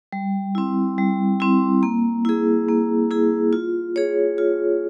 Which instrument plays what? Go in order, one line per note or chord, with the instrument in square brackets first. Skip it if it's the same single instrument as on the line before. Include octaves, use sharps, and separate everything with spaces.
[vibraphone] G3
C4 E4
G3
C4 E4
A#3
E4 G#4
A#3
E4 G#4
F4
G#4 C#5
F4